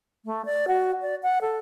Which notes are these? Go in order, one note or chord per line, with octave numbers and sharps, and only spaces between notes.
A3
D5
F#4
D5
F#5
A4